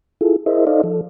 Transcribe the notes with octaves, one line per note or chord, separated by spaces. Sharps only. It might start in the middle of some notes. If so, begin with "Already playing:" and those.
E4 F4 G#4 A4
E4 G#4 A#4 C5 D#5 E5
D#4 A4 C5 D5 D#5 F5
F3 A4